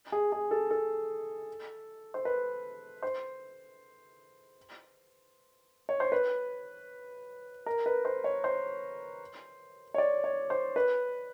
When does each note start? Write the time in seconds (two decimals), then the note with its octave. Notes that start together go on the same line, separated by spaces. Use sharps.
0.12 G#4
0.32 G#4
0.51 A4
0.71 A4
2.14 C5
2.25 B4
3.03 C5
5.89 C#5
6.00 C5
6.12 B4
7.66 A#4
7.86 B4
8.05 C5
8.24 C#5
8.44 C5
9.94 C#5
9.98 D5
10.24 C#5
10.50 C5
10.76 B4